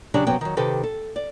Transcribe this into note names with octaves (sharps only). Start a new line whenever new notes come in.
C#3 F#3 D4 G4 C#5 D5
F#2 C3 F#3 B3 G5
D#3 F#3
C3 D#3 G4 A4 B4
A4
D5